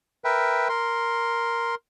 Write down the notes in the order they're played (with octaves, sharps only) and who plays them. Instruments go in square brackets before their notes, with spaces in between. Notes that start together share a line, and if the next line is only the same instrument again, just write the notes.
[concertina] A#4 B4 E5 G5
A#4 C6